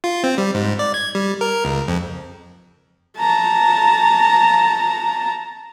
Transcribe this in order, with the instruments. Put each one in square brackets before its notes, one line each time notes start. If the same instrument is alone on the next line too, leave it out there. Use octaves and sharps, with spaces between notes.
[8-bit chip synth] F4
C4
G3
G#2
D5
G#6
G3
A#4
C#2
F2
[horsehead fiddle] A5 A#5